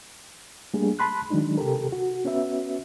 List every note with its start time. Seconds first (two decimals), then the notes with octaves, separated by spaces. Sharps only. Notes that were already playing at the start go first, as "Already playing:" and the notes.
0.74 G3 A3 A#3 D4 G4 G#4
0.99 A5 B5 C6 F#6
1.30 D#3 F#3 G#3 D4 D#4
1.58 C3 G4 A4 A#4
1.92 F#4
2.25 B3 C#4 F#4 B4 E5